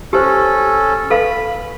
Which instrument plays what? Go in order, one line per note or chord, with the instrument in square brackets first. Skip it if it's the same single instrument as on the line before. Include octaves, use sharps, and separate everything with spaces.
[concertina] C#4 A4 [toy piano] G4 C5
[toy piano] A4 B4 F5 [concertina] B5